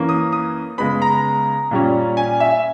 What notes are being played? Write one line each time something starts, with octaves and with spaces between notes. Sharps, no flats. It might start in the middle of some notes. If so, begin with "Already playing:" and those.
Already playing: E3 A#3 C#4
D#6
D#6
C#3 G#3 B3 B5
A#5
A#2 G3 C#4
G#5
E5